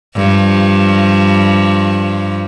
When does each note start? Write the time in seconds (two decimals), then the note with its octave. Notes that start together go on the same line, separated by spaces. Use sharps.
0.16 G2 F3